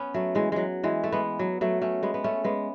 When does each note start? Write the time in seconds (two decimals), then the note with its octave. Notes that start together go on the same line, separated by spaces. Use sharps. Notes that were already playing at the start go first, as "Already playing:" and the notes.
Already playing: B3 C#4
0.14 F#3 A3
0.35 E3 G#3
0.52 F#3 G#3
0.84 E3 G#3
1.04 A3
1.12 G#3 B3
1.39 F#3
1.61 F#3 A3
1.81 A3 C#4
2.03 G#3 B3
2.14 B3
2.24 A3 C#4
2.44 G#3 B3